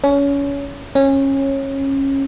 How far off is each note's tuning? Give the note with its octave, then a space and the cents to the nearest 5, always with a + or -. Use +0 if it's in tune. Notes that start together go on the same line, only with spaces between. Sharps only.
C#4 +25
C#4 -20